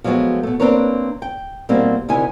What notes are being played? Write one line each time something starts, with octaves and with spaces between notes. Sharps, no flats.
F3 F#3 G#3 A3 B3 F#4
B2 A3
A#3 C4 D4 A#4 B4 C#5
G5
B2 G3 A3 A#3 C4 E4
D2 C3 D#3 E4 G#5